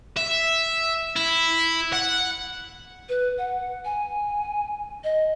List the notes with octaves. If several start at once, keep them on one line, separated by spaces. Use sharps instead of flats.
E5
E4
F#5
B4
F#5
G#5
D#5